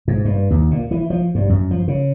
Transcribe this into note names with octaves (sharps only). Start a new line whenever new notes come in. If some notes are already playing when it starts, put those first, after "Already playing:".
G#2
G2
D#2
A#2
E3
F3
G2
F#2
F3
C#3